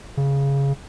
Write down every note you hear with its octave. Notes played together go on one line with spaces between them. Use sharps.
C#3